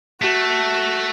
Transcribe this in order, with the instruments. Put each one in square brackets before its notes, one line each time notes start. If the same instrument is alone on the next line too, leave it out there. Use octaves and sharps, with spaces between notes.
[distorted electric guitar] A3 [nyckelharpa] F#4